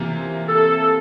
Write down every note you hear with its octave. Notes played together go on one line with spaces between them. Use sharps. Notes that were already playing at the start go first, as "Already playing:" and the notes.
Already playing: C3 E3 A#3 F4
A4